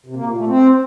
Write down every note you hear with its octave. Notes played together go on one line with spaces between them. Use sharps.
C3
A#3
A#2
A3
C4